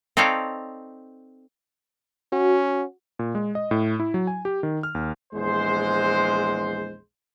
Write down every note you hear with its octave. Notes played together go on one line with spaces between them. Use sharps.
C4 D#4 A4 C#5 D5 F5
C#4 F#4
A#2
G#3
D#5
A2
E4
F#3
G#5
G4
D#3
F6
D#2
A#1 E2 G#3 C5